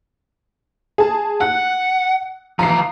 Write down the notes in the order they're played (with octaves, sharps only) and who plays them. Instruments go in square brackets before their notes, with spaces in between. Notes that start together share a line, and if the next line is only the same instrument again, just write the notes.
[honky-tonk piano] G#4 A5
[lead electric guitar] F#5 [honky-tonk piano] F#6
[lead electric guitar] E3 F3 [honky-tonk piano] A#5 C7